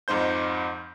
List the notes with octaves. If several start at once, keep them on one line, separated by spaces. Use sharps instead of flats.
F2 G#2 D#4 C5 G6